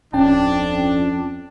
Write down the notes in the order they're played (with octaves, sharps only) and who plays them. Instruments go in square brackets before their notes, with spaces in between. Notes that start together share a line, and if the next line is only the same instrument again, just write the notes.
[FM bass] D1 [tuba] F2 [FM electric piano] C#4 G5 A5 [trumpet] D4